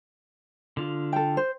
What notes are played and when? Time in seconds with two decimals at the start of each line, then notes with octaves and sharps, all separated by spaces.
0.77 D3 F4
1.13 A4 G5
1.37 C5